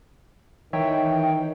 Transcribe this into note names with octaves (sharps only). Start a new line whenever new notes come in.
D#3 E3 D#4 C#5 E5 G5